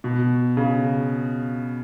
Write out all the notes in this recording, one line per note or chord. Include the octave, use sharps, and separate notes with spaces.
B2
C#3